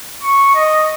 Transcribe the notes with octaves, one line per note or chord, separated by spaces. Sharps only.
C#6
D#5